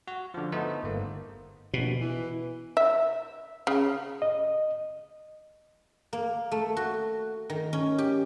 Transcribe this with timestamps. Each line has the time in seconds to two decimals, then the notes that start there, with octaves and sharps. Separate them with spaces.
0.07 F#4
0.34 D3 F3
0.52 A3 B3 D#4 C5
0.83 G1 A#3
1.74 A#1 B2
2.01 E3
2.77 E5
3.67 C#3
4.22 D#5
6.13 A#3
6.51 A3
6.77 F#4
7.50 D#3
7.73 C#4
7.98 G4